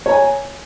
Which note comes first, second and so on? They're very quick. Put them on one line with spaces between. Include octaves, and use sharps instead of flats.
C#5 A#5 G#5